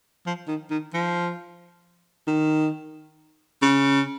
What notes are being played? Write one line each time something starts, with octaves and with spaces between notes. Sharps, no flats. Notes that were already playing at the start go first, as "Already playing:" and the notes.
F3
D#3
D#3
F3
D#3
C#3